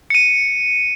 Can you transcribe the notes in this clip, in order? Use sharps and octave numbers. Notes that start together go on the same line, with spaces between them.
C#7 D#7